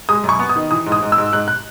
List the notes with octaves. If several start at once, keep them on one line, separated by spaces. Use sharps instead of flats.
G#3 D#6
F#2
C#6
B3
D#6
D#3
E3 D#6
G#2
D#6
G#2
E6
G#2
G#2 F#6
F#6